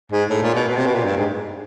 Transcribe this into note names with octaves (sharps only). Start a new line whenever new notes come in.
G#2
A2
A#2
B2
B2
C3
B2
A#2
G2
G#2